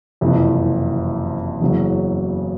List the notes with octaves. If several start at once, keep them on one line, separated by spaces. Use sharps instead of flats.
F#1 F2 C3 E3
F#1 E2 C#3 F#3